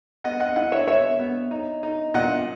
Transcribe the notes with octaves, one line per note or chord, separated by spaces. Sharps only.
B3 D#5 F#5
D#5 F#5
E4 D#5 F#5
C#5 E5
B3 C#5 E5
B3
D#4
D#4
A#2 D#5 F#5